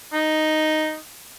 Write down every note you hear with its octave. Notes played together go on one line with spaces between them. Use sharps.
D#4